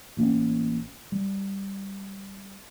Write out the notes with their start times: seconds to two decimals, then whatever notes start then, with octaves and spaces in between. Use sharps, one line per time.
0.17 A1 A#3 C4 C#4
1.12 G3